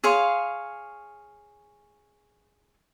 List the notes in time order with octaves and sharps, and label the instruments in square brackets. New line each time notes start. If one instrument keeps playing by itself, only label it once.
[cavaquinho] G#4 C#5 F5 C6